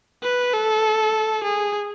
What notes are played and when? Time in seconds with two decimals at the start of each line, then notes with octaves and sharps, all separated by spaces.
0.23 B4
0.53 A4
1.44 G#4